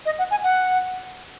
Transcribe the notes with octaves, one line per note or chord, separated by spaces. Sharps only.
D#5
F#5
G#5
F#5